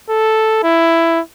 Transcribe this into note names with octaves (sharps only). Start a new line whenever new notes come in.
A4
E4